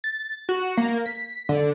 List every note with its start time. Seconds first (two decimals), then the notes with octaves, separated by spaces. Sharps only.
0.04 A6
0.49 F#4
0.77 A#3
1.06 B6
1.49 D3